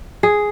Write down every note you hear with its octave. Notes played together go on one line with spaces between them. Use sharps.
G#4